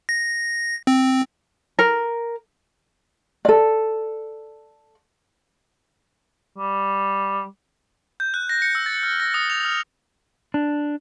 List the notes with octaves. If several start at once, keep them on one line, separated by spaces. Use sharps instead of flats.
A#6
C4
A#4
A4 D5
G3
G6
F#6
A#6
C#7
E6
A6
F6
A#6
D#6
F7
F6
D4